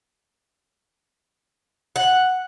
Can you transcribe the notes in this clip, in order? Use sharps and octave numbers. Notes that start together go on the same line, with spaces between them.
F#5